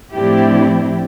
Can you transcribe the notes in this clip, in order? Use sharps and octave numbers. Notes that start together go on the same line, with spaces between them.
A2 F3 C4 D4 E4 G4